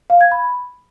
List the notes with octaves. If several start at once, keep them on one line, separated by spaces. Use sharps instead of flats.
F5
G#6
B5